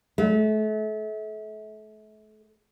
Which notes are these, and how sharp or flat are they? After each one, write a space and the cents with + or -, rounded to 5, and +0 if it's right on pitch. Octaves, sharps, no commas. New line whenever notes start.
A3 -35